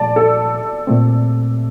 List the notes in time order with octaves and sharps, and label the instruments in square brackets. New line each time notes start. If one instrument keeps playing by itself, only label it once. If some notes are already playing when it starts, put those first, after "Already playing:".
Already playing: [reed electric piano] A#2 F3 A3 [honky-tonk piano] D5 A5
[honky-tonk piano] A4
[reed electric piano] A#2 A3 C4